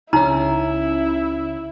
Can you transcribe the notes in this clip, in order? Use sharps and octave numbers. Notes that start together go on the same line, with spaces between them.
C#2 C#3 C#4 D#4 E4 A#5